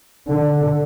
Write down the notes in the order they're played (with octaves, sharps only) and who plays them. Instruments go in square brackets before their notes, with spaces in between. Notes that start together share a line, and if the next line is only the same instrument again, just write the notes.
[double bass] D3